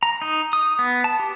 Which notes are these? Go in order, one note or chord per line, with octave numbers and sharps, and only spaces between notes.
A#5
D#4
D#6
B3
A5
G4